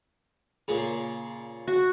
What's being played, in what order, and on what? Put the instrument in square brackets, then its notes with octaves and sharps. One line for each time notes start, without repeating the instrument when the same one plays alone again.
[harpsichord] A#2 C#3
[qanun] F#4